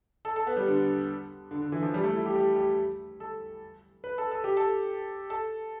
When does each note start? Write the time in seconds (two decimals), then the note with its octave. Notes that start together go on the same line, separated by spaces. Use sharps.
0.25 A4
0.36 A4
0.47 B3
0.57 G3
0.67 D3
1.51 D3
1.62 D3
1.72 E3
1.82 F3
1.94 G3
2.04 A3
2.15 E4
2.26 G4
2.36 G4
2.56 G4
3.20 A4
4.04 B4
4.18 A4
4.31 A4
4.44 G4
4.57 A4
5.30 A4